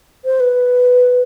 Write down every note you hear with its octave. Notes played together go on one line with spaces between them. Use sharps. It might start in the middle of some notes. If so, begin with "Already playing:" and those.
C5
B4